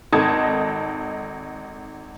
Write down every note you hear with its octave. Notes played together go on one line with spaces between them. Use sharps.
G#1 D#4 A4 D#5 A5 G#6